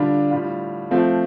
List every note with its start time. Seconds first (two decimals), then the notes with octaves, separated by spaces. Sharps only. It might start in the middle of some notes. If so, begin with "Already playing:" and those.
Already playing: D3 G3 D4 F4
0.31 A2 G3 F4
0.91 F3 A3 C4 F4